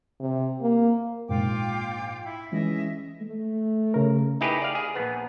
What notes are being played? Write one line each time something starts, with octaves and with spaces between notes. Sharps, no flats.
C3
A#3
A#1 G#2 F4 G5 D6
E4
E3 G#3 C#4 D#5 E5
A3
C#3 A#4
D#4 E4 G4 G#4 B4
D5 F5
G#4
A#1 B3